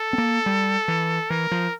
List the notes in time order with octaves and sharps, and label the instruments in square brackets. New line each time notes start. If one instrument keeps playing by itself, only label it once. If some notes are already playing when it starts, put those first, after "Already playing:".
Already playing: [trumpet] A4
[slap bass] C4
A#3
G3
E3
[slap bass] E3 [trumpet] A#4
[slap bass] F3